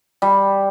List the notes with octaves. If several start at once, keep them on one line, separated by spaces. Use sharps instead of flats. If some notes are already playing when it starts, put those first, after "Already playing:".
G3